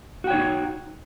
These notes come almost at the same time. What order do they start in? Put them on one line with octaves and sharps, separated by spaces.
F#4 G5 C#5 D#4